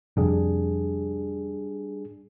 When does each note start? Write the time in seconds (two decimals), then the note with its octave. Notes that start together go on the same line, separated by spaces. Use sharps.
0.17 F2 C3 G3 D4 G#4